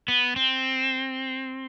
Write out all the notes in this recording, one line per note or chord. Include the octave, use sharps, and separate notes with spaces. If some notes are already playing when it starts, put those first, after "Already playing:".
B3
C4